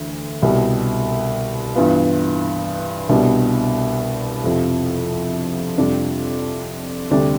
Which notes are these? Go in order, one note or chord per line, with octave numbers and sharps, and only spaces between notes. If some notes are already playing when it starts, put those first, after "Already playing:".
Already playing: D2 E3
C2 B2 G3
G2 E3 B3 F4
C2 B2 G3 B3 D4
F2 C3 F3
F2 C3 G3 D4 F4
D2 C3 G3 D4